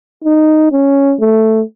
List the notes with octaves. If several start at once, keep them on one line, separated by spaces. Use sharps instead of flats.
D#4
C#4
A3